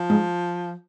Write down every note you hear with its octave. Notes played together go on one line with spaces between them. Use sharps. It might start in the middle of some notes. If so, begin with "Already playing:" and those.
Already playing: F3
G#2